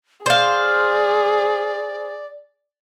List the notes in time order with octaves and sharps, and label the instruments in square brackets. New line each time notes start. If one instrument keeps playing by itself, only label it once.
[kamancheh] G#4 [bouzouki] C5 F5 [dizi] D5